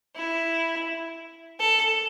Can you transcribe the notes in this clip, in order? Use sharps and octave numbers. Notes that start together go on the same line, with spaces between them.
E4
A4